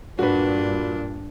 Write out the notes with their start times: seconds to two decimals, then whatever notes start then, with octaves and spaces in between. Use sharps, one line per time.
0.19 G2 A#2 D4 F#4 B4